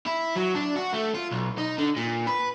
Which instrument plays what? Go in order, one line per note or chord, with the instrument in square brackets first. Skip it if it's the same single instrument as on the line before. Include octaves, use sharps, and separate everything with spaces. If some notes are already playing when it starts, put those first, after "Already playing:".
[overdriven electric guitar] E4
F#3
D4
F#4
A3
F4
B1
D#4
D3
A#2
B4